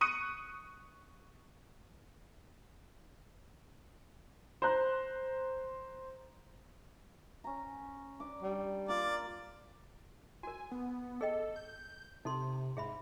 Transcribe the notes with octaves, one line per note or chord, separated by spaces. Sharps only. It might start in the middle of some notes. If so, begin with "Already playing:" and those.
C#6 D#6 F#6 C#7 D#7
C5 A#5 F#6
C#4 A#5
D4 D6
G3
A#3 F4 D5
F#4 A#4 G#5
B3
G#4 A4 D#5 G5
G6
C3 D#4 A4 C6
G#2 G#4 E5 B5